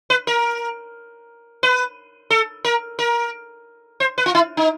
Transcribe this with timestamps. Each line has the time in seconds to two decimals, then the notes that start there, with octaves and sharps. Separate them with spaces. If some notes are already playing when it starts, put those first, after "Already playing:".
0.10 B4
0.27 A#4
1.63 B4
2.30 A4
2.65 A#4
2.99 A#4
4.00 C5
4.18 B4
4.26 F4
4.35 E4
4.57 D#4